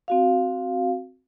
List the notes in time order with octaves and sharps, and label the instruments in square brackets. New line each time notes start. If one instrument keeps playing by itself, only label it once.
[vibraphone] C4 F#4 F5